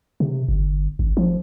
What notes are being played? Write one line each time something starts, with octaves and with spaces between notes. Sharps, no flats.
C3
G1
G#1
F3